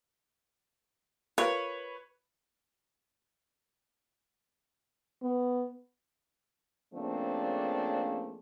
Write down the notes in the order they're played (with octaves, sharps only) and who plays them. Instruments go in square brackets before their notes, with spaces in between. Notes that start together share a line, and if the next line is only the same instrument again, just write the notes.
[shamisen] F4 A#4 [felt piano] B4 [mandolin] C#5
[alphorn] B3
[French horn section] C#3 F3 A3 A#3 C4 D4